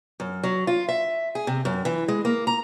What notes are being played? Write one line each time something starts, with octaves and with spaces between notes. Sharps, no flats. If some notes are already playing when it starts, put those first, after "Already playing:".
F#2
F#3
F4
E5
G#4
C3
F#2
E3
G#3
A#3
A#5